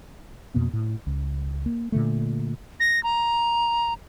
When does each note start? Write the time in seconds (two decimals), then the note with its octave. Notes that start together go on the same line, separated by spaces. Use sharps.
0.54 F2 B2 A#3 B3
0.73 A2
1.07 C#2
1.66 A#3
1.92 A#2 D3 A3
2.80 A#6
3.04 A#5